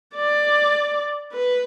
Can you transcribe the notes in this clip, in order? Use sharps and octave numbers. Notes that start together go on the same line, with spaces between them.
D5
B4